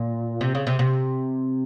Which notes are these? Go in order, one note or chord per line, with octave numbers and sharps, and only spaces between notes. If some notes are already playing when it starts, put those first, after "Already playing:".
Already playing: A#2
C3
C#3
C3
C3